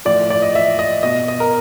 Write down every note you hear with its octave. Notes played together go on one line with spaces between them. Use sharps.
A2 F3 D5
D5
D#5
E5
D#5
B2 D#5
D#5
A#4